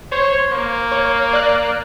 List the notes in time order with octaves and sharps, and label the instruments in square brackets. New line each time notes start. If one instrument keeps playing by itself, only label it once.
[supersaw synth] C5 [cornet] C#5
[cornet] A#3
[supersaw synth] C#5
D5 F#6